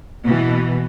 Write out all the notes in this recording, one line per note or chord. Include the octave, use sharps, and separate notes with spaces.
B2 E3